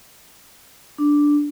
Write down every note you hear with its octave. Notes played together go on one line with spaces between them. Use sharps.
D4